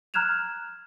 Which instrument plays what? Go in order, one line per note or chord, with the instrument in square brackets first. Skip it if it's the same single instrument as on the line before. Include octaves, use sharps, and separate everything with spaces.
[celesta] A#5 F6 F#6 G#6 E7 F7